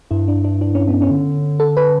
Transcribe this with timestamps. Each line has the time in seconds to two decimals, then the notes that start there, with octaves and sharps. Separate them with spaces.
0.11 G2 E4
0.28 D4
0.44 D4
0.61 D4
0.75 C#4
0.88 B3
1.02 C#4
1.11 D3
1.60 A4
1.77 B4